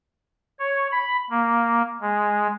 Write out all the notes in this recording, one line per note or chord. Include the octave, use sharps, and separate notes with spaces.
C#5
B5
A#3
G#3